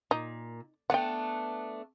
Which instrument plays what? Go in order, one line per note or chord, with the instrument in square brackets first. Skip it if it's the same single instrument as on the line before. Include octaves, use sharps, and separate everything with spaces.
[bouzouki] A#2 [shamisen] D#4
[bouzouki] A3 B3 D4 [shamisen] F#5 G5